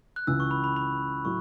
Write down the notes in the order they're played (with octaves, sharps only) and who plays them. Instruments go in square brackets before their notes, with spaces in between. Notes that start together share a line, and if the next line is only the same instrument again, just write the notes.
[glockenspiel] F#6
[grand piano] C#2 C#3 E3 [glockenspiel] E6
[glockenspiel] C#6
B5
B5
B5
[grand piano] A2 F#3 [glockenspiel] C#6